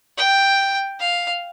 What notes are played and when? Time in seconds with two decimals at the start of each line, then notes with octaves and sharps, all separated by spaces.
0.18 G5
1.00 F5